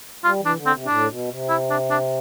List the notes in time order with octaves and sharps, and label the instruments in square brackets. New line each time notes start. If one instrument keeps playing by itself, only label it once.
[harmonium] G3 [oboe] F4
[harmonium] E3
[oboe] D4
[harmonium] C3
D3
[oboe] C4
[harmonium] C3
[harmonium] A2 [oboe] D4
[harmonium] B2
C3
[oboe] E4
D4
D4